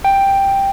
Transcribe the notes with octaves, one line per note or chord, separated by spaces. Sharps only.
G5